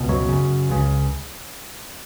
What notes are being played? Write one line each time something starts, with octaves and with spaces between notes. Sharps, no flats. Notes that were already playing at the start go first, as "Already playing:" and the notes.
Already playing: C#2 B2
F#2 F#3
F#2 C#3
C#2 C#3